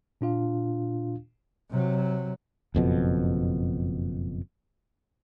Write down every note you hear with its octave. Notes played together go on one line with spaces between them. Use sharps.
A#2 D4 F4 F5
C3 F#3
F#1 F2 B2